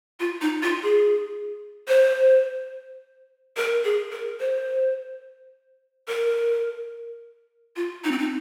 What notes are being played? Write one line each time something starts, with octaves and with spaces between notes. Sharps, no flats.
F4
D#4
F4
G#4
C5
A#4
G#4
A#4
C5
A#4
F4
D#4
C4
D#4